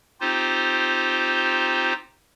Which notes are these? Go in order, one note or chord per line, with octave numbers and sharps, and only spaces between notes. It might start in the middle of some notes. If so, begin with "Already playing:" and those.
C4 D#4 F4 G4 C5